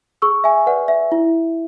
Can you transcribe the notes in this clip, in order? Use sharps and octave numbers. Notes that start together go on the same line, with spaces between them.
G#4 C#6 E6
E5 G#5
B4 D5 F#5
E5
E4